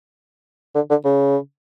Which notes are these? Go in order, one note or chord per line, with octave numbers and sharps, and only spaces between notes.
D3
D3
C#3